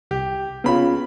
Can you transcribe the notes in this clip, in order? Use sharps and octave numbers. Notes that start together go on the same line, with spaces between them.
C2 G4
C#3 B3 C#4 F4 B5